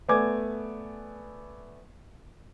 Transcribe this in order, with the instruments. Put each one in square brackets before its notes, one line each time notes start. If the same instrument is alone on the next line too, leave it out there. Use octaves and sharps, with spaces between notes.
[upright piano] A3 B3 D5 G#5 D6 G#6